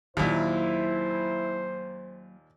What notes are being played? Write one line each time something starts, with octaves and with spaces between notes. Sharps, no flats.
D#2 A#2 F#3 A#3 E4 C5